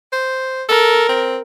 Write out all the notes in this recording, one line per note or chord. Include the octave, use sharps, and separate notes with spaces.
C5
A4 A#4
C4